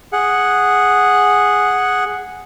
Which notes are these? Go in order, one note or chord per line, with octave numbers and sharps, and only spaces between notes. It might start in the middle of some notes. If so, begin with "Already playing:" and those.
G#4 F#5